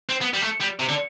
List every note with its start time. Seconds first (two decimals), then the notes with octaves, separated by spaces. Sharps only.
0.09 C4
0.21 B3
0.34 G3
0.41 A3
0.60 G3
0.79 C3
0.89 D3